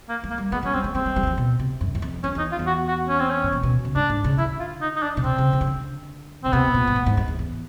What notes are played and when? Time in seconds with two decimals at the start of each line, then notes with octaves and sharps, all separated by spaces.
0.09 A#3
0.23 G#3
0.30 A#3
0.38 G3
0.52 G#3 B3
0.63 F#3 C#4
0.73 G3 C4
0.84 G#3
0.95 G#3 C4
1.06 G#3
1.16 G3
1.23 E3
1.27 F3
1.38 B2
1.59 C3
1.81 F#2
1.95 F#2
2.02 F2
2.23 F2 C#4
2.35 E2 D#4
2.52 F4
2.59 E2
2.67 F#4
2.88 F#4
3.09 C#4
3.20 C4
3.30 C#4
3.44 A2
3.52 A#2
3.63 B2
3.85 C#3
3.95 G#2 D4
4.10 G#2
4.24 C#3
4.38 D3 E4
4.60 F4
4.82 D#4
4.96 D#4
5.03 D4
5.17 B2
5.24 C3 C4
5.38 C#3
5.53 C#3
5.61 D#3
5.67 D3
6.44 C#3 C4
6.52 C3 B3
6.74 A#2
6.87 G#2
6.96 A2
7.06 G#2
7.17 F2
7.28 E2
7.39 E2